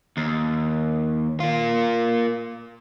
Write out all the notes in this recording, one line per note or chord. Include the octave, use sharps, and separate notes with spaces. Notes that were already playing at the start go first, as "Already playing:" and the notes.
D#2
A#3 F4